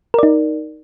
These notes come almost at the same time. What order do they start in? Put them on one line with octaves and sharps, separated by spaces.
A#4 D5 D#4